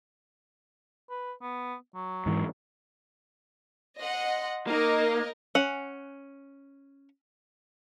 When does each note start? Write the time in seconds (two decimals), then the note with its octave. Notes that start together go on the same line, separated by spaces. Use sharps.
1.10 B4
1.42 B3
1.95 F#3
2.26 G#2 E3
3.99 D#5 F#5 C6
4.67 A#3 D#4 A#4 D#5
5.55 C#4 F#5